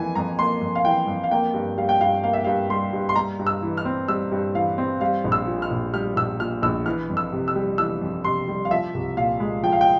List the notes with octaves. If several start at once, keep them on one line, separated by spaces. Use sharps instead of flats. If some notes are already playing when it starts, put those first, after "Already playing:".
Already playing: F2 E3 A#3 G#5
F2 A#5
A#3 C6
F2
F5
E3 G5
F2
F5
A#3 G5
G2
G3 F5
G5
G2 F5
A#3 F5
E5
G2 F5
G3 C6
G2
C6
G3 A#5
G2
E6
E3
F6
C4
G3 E6
G2
E3 F5
C4
G3 F5
A#1
E6
A#2
F6
A#1
G3 F6
A#1 E6
A#2 F6
A#1 E6
E3 F6
F2
E6
C3
E6
G3
E3 E6
F2
C3 C6
G3
F5
F3 E5
C2
A#2 F5
G#3
F3 G5
F5
G5